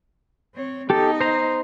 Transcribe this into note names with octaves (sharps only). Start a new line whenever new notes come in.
C4 C#5
B3 D#4 G4 A4
C5 A#5